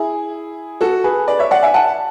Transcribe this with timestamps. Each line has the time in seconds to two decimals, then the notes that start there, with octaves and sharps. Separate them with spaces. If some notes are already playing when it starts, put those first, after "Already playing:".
Already playing: E4 G#4
0.81 F#4 A4
1.04 G#4 B4
1.27 B4 D5
1.39 C#5 E5
1.51 D5 F#5
1.62 E5 G#5
1.74 F#5 A5